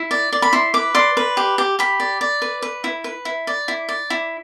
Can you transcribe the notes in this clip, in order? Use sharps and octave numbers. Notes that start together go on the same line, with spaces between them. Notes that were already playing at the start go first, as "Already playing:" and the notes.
Already playing: E4
D5
D5
B5
E4 C6
B4 D6
D5 C6
B4
G4
G4
G4 B5
D5
D5
B4
B4
E4
B4
E4
D5
E4
D5
E4